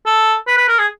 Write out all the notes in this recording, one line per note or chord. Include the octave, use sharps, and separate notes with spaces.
A4
B4
B4
A#4
G#4